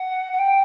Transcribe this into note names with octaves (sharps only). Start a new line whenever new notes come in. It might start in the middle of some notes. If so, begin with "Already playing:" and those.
Already playing: F#5
F#5
G5